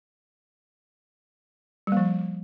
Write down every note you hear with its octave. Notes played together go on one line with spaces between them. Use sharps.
F3 G3 A#3